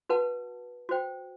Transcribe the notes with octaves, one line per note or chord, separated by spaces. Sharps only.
F#4 B4 F#5 A5
F#4 C5 G5